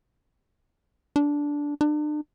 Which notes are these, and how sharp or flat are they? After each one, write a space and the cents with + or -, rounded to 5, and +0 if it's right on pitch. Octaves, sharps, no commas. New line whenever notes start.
D4 -10
D4 +40